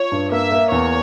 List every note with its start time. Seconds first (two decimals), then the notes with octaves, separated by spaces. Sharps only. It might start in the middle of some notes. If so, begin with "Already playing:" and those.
Already playing: F4 C#5
0.12 G2
0.32 A#3 E5
0.52 A#3
0.72 E2 C#5